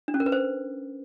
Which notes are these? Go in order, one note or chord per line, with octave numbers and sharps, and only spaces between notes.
D4
C#4
A#4
B4
C5